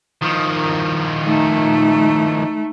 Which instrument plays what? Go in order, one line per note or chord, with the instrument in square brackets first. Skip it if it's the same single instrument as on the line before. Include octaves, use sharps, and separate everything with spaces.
[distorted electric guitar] D#3 F3
[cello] A3 [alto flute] D#4